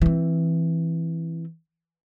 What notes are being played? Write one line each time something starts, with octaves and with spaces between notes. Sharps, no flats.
E3 C4